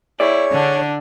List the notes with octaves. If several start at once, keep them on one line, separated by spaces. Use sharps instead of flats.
E4 G#4 C#5 D5
D3 D4